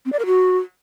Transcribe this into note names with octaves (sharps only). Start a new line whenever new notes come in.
C4
D5
A#4
F#4